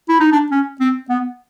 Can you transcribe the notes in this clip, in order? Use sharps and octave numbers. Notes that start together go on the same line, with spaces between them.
E4
D#4
D4
C#4
C4
B3